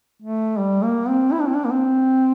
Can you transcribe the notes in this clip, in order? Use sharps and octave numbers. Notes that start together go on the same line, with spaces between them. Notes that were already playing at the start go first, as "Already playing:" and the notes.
A3
G3
A#3
C4
E4
D4
C4
D4
A#3
C4